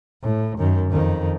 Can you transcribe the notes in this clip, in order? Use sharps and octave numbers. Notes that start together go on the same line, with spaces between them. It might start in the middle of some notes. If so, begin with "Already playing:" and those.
A2
F#2 D#3
F2 D#3